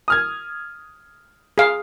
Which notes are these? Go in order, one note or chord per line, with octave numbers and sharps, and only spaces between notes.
D#6 F6 G#6
G#4 F5